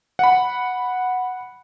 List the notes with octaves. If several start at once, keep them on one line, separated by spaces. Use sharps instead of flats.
F#5 B5